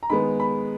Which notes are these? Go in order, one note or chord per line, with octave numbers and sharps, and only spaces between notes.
A#5
D#3 G#3 B3 B5
B5